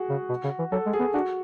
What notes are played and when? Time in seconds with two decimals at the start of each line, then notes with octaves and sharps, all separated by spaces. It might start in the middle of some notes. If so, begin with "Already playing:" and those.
Already playing: F#4 G#4
0.09 C#3
0.29 B2
0.44 C#3
0.59 E3
0.72 F#3 A4
0.86 G#3
0.93 G#4
1.00 B3
1.14 D4 F#4